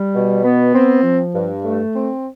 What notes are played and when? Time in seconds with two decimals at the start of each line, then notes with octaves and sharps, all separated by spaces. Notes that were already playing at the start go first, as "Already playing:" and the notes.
Already playing: G3
0.14 B2
0.44 B3
0.74 C4
1.04 F3
1.34 G2
1.64 A3
1.95 C4